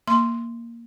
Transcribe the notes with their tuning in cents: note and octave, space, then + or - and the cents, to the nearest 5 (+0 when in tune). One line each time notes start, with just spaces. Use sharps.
A#3 +0 C6 +0